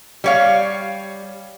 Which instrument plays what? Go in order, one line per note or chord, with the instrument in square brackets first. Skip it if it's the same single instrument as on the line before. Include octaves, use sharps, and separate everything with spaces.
[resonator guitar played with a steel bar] G3 C#5 F5